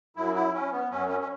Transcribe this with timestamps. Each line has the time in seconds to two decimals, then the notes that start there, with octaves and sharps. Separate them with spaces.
0.16 F#2 F#3 E4
0.35 E4
0.54 C#4
0.72 B3
0.90 F#2 F#3 C#4
1.08 C#4
1.20 C#4